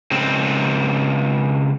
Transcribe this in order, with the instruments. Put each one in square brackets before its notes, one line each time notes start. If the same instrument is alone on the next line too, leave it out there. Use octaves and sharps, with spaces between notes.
[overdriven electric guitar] C#2 C4